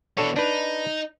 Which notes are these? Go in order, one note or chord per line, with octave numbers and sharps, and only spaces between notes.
B2 E3 D4 A4 C#5
D4 D#4 B4